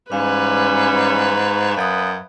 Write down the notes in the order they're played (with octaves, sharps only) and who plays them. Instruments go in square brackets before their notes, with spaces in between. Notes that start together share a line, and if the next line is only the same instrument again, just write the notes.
[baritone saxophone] G#2 [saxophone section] E3 G3 C#4 [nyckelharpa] B4 [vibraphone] F5
[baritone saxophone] F#2 [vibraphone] F5 D#6